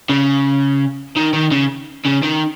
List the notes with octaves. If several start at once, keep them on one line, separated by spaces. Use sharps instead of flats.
C#3
D#3
D#3
C#3
C#3
D#3